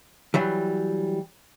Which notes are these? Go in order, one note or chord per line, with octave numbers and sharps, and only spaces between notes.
E3 F#3 G3